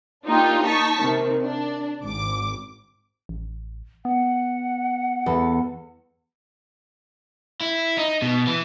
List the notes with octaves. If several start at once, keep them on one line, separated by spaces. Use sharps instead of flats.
A#3 D4 D#4 F4 G4
D#4 A5 C#6 B6
C3 D#3
D4
G#1 D6
A1
B3 F#5
E2 A4
E4
D#4
B2
E3